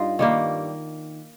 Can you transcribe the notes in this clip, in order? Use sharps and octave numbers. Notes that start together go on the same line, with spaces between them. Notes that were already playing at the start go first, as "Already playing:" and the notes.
Already playing: G2 D#4 F4
D#3 G3 A#3